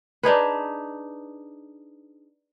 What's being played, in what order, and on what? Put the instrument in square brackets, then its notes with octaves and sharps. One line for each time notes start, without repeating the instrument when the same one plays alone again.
[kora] D4 D#4 G#4 B4